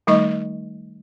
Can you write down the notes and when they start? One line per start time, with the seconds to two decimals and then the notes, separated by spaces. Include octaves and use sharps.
0.07 D#3 G3 A3 D#4 D#5 C#6